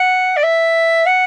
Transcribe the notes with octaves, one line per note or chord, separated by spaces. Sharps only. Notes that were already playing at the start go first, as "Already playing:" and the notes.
Already playing: F#5
D5
E5
F#5